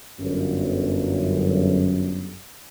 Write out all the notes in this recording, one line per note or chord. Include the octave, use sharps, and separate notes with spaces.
G1 F#2